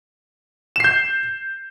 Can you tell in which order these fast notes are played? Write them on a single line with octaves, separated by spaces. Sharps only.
E7 C7 G6